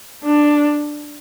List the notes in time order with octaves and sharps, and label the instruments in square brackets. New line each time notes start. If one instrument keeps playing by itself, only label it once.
[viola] D4